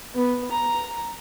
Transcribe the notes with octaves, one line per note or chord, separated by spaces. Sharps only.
B3
A#5